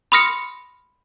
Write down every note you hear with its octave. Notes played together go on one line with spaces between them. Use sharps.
B5 C6 D#6 F6 A#6 C#7